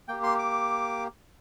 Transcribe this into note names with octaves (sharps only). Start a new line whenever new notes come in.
A#3 G4 G5
C6
D6